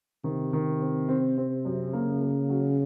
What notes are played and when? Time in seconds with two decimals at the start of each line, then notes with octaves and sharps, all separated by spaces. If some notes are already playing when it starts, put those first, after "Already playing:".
0.24 C3 D#3
0.53 D#3
0.81 C4
1.09 C4
1.38 C4
1.65 F#2
1.93 C#3 A#3
2.22 A#3
2.49 F#3